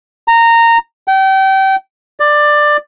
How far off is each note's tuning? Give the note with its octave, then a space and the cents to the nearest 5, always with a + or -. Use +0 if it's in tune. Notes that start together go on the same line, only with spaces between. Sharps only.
A#5 -15
G5 -30
D5 +15